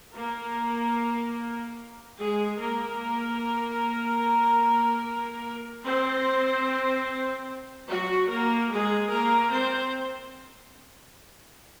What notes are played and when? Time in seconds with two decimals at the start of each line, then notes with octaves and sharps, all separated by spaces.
0.16 A#3 A#4
2.19 G#3 G#4
2.60 A#3 A#4
5.85 C4 C5
7.89 F#3 F#4
8.30 A#3 A#4
8.71 G#3 G#4
9.11 A#3 A#4
9.52 C4 C5